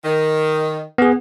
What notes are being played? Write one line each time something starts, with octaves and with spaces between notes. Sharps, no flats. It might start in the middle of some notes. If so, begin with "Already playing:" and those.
D#3
B3 G#4